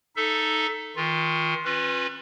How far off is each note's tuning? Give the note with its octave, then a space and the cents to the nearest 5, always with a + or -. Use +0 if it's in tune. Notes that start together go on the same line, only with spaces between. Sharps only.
D#4 +0 A4 +0 E5 +10
D#3 +40 F4 +5
C#4 -35 F4 +30 B4 +0